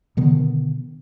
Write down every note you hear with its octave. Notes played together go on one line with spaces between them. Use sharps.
B2 D3 D#3 B3